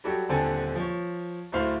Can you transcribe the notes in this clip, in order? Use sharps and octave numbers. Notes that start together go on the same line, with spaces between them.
F#3 G3 F#4 G4 A4 D5
D#1 D3 C4 D4 A4 G#5
F3 C#5
D1 A3 E4 C5 F5 B5